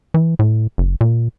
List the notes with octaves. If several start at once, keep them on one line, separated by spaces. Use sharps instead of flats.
E3
A2
F#1
A#2